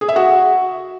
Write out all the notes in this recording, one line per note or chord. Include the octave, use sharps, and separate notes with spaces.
G#4
E5
F#4